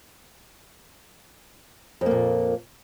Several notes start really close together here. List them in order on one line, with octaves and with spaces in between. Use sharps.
F2 A#3 A#2